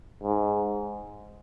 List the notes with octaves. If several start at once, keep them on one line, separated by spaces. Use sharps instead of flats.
G#2